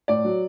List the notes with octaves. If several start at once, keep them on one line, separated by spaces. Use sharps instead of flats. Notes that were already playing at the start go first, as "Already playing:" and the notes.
A2 D5
F#3